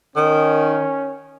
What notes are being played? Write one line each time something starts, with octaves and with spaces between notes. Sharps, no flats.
D#3 C#4